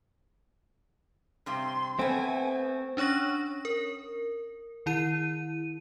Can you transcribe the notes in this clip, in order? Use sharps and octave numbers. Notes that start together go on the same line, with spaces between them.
G2 C3 C4 C6
A3 B3 C4 G#5
C#4 D4 C#5 C#6 A#6
A#4
D#3 E4 D#7